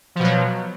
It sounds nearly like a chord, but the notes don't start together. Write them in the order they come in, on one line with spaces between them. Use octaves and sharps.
F3 B2 F#3